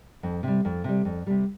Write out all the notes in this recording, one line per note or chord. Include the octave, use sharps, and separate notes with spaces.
F2
C3 G3
F2
C3 G3
F2
C3 G3